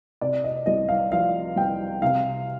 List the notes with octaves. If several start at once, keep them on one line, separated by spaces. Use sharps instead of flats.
C3 D5
D#5
C2 D#5
F5
F3 F5
C2 G5
C3 F5